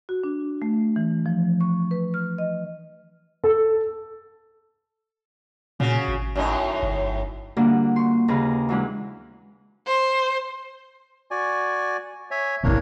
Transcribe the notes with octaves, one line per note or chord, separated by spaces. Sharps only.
F#4
D4
A3
E3
F3
C#6
B4
F6
D#5
A4
A#2 C#3 F#4
G#1
F#2 A2 D#4
G1
D3 G3 A#3 D4 F4 F#4
C6 C#6
D#2 C#3 G#4 B4 A#5
E3 F#3 G#3 C#4 D4
C5
F#4 D5 G#5
C#5 E5 G#5
A1 A#3 D4 E4 C#5